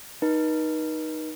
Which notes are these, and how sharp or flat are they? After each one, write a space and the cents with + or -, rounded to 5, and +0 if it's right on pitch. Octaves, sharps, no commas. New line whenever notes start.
D#4 +0 B4 -45